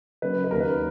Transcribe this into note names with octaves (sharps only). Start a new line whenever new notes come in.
C#3 F#3 A#3 C#4 B4
B4
D#2 D#3 A#3 C#4 A#4
B4